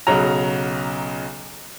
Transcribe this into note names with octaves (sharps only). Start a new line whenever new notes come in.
B1 C#3 F#3 A#5